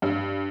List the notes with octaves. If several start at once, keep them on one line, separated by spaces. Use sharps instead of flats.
G2